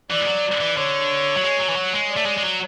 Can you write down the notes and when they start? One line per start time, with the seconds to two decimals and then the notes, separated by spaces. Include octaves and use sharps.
0.11 E3 D5
0.21 G#3
0.27 F#3
0.61 E3
0.77 D3 C#5
1.37 F#3
1.43 G#3
1.60 F#3
1.69 E3
1.76 F#3
1.93 G#3
2.10 D5
2.17 A3
2.26 G#3
2.38 G#3
2.43 F#3